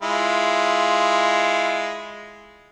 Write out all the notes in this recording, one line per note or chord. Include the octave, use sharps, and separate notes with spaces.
G#3 E4 F4